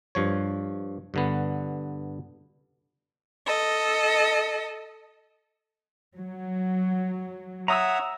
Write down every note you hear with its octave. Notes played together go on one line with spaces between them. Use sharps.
G2 F3 C#5
G2 D3 B3
A4 D#5
F#3
C#5 E5 F#5 A#5 D#6 E6